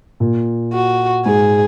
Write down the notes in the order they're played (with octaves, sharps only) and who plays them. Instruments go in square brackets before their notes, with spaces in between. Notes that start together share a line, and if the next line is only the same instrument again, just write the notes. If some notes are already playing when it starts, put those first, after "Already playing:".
[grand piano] A#2
[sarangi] F#4
[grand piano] G#2 [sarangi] G#4